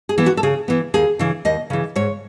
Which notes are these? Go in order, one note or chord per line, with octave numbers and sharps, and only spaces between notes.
G#4
E3 B3
F#4
A4
C#3 G#4
E3 B3
D#2 G#4
C#3 E3
D#2 D#5
C#3 E3
G#2 C#5